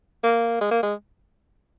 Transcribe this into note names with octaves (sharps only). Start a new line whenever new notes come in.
A#3
G#3
A#3
G#3